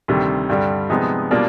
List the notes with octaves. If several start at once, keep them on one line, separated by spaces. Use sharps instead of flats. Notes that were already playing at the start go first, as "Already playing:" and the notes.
D2 C3 D#3 G3
G2 D3 G3
C3 F3 G#3 B3 D#4
B2 G3 A#3 D4 F4